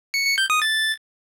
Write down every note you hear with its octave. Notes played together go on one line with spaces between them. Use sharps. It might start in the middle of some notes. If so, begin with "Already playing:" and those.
C#7
C#7
G6
D#6
A6